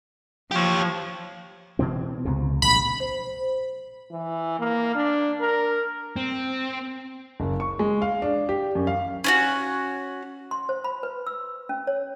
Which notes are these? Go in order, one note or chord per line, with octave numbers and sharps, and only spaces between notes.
F3 G4 C#5
B2 E3 C4
C#2 C3
A#1 B5
C5
E3
A#3
D4
A#4
C4
F#1
C#6
G#3
F5
D4
G4
F#2
F5
C#4 D4 F#4
C6
C5
B5
B4
E6
C#4
C#5